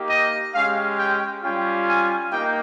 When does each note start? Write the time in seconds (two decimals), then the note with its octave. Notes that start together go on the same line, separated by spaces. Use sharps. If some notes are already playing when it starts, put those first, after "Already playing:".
Already playing: A#3 D#4 G4
0.09 D#5
0.53 G#3 C#4 G4 F5
0.97 G5
1.42 G3 C#4 F4 G5
1.86 G#5
2.31 A#3 D#4 G4 G5